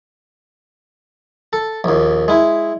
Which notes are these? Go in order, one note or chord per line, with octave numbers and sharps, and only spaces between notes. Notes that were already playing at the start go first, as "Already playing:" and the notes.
A4
A#1 D#2
G#3 E4